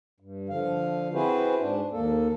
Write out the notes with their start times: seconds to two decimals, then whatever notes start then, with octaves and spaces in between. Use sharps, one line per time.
0.20 G2
0.49 D3 F3 F5
1.14 C4 E4 F#4 G#4 B4 C5
1.60 G#2 D4
1.91 D#2 A#3 A4